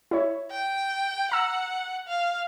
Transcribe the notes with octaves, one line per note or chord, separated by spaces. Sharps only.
E4 C#5
G5
F#5 A#5 E6
F5